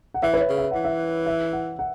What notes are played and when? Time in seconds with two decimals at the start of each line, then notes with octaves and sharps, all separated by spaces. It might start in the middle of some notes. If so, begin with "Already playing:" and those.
0.14 F#5
0.23 E3 E5
0.34 B4
0.40 C#5
0.49 C#3
0.58 E5
0.71 E3 F#5
0.84 E5
1.26 E5
1.53 F#5
1.79 F#5